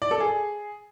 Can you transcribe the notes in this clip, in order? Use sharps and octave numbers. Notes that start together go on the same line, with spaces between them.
D5
A4
G#4